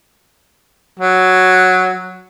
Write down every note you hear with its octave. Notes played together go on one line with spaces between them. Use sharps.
F#3